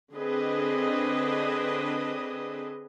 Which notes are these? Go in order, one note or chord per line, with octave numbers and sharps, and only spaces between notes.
D3 C4 D4 G#4 B4 D#5